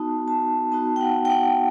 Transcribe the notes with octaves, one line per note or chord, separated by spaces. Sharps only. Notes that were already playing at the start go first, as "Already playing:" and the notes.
Already playing: B3 D#4 F#4 A5
A5
B3 D#4 F#4 A5
G5
F#5
G5
F#5